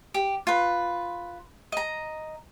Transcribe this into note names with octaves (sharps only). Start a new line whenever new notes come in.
G4
F4 B4
D#5 A#5